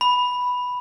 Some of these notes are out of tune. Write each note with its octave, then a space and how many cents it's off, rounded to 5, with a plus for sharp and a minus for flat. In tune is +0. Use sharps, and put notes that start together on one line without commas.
B5 +0